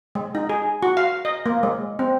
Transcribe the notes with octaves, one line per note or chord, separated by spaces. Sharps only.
G#3
D#4
G#4
F#4
F5
D#5
A#3
G#3
C4